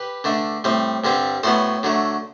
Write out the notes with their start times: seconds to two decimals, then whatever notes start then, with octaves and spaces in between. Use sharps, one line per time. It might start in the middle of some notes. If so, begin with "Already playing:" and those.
Already playing: G4 B4
0.24 D3 A3 D4
0.64 A2 G3 C4
1.04 G2 D3 G3 C4
1.43 A2 F#3 B3 A4 C5
1.83 D3 F#3 A3